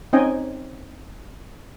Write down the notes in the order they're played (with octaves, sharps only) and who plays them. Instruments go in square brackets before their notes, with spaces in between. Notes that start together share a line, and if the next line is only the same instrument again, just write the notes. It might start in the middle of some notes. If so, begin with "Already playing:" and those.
[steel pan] C4 C#4 D#4 D#5 G5 G#5